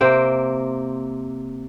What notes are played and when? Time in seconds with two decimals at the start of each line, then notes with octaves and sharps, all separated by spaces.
0.01 C3 A#3 C5 G5